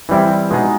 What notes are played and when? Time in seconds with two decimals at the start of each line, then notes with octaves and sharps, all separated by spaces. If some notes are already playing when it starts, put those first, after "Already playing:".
0.09 E3 G3 C4 E4
0.50 B2 G#3 B3 D#4 G#4